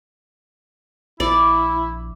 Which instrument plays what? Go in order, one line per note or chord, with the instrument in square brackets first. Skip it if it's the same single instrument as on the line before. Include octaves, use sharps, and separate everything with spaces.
[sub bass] A#1 [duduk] E4 [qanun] D5